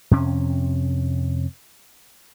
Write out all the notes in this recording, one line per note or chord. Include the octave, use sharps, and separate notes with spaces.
F2 C3 C#4